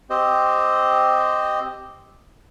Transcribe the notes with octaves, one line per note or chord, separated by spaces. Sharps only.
C4 G4 C5 D#5